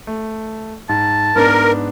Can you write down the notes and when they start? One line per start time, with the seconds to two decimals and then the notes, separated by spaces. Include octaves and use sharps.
0.07 A3
0.89 G#2 A5
1.36 G#2 B3 D4 A#4